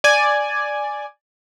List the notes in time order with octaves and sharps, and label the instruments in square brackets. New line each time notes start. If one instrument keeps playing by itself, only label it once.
[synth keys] D5 G#5